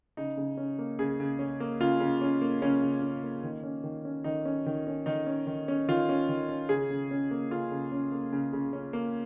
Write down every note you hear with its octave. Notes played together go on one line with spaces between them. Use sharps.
C#3 D#4
C#3
C#4
A#3
C#3 G#4
C#3
C#4
A#3
C#3 F4
C#3
C#4
A#3
C#3 C#4
C#3
C#4
A#3
D#3
C#4
D#3
C#4
D#3 D#4
C#4
D#3
C#4
D#3 D#4
C#4
D#3
C#4
D#3 F4
C#4
D#3
C#4
C#3 G#4
C#3
C#4
A#3
C#3 F4
C#3
C#4
A#3
C#3
C#3
C#4
A#3